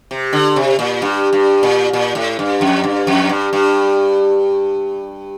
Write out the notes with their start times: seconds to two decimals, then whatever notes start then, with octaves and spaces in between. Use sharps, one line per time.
0.11 C3
0.33 D3
0.56 C3
0.79 A#2
1.02 G2
1.33 G2
1.63 A#2
1.93 A#2
2.15 A2
2.39 G2
2.61 F2
2.84 G2
3.07 F2
3.29 G2
3.53 G2